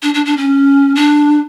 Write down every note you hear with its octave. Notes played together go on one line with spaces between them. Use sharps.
D4
D4
D4
C#4
D4